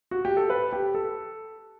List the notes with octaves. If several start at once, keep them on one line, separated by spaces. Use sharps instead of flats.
F#4
G4
A4
B4
G4
A4